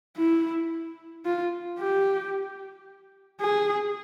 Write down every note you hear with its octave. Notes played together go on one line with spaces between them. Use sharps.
E4
F4
G4
G#4